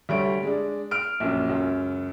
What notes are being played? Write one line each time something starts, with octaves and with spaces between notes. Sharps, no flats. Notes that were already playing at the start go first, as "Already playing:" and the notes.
D2 G3 C#5 D7
G#3 D4
F6 D7
A#1 F#2
C#2 F#2